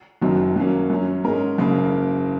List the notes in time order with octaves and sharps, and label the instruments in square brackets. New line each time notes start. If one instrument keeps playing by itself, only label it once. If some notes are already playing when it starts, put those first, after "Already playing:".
[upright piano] F#1 F#2 D#3 F#3
F#2 F#3 A#3 C#4
F#2 F#3 C#4
G#2 G#3 C#4 A#4
F#1 F#2 C#3 A#3